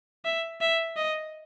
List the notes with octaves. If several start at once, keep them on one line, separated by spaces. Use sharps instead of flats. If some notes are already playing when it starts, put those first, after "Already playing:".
E5
E5
D#5